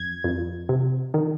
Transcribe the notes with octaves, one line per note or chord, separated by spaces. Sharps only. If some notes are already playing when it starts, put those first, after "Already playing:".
Already playing: F2 G#6
F2
C3
D#3